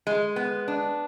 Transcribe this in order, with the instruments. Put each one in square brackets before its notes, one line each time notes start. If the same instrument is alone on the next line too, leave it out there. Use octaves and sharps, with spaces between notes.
[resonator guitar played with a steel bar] G#3
B3
D4